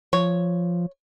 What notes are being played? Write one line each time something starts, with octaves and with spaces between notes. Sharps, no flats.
F3 C#5